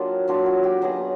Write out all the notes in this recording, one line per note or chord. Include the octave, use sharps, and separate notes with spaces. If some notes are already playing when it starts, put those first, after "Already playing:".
Already playing: F#3 A#3 D4 F4 G4
F#3 A#3 D4 F4 F#4
F#4
G4
F#3 B3 D#4 G#4